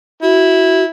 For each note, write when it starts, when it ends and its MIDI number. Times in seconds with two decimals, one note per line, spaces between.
0.23 0.90 64
0.23 0.84 66